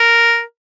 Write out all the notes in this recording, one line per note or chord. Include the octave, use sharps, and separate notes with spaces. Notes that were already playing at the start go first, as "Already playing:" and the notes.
Already playing: A#4